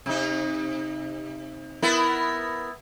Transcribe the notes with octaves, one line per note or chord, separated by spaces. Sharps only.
C3 D#4
B3 E4 A#4